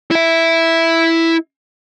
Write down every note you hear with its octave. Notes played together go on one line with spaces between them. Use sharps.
E4 E5